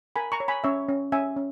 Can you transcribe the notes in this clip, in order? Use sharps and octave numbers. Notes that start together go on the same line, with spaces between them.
A#4 G#5 B5
A#5 C#6
C#5
G#5 B5
C#4 C#5 E5
C#4
C#4 E5 G#5
C#4